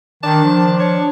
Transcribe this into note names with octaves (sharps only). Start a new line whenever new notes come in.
D#3 D4 A5
F3
C#5